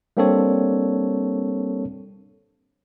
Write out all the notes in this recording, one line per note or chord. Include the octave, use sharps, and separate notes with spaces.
G3 A#3 C4 D4 A4 C#5